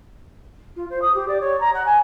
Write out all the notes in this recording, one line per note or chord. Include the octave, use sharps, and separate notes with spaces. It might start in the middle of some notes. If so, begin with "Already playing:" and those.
F4
C5
D#6
G4
D5
C#5
A#5
F#5
G#5